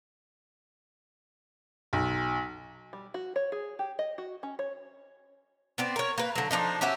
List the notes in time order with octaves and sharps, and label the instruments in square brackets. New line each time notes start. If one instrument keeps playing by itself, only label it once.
[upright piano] B1
[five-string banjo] G3
F#4
C#5
G#4
G4
D#5
F#4
C#4
C#5
[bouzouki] B3 C4 D5
A#4 C#5
A#3 B4
D3 F#3
F3 F#3 D4 D#4
C#4 F#4 G4 E5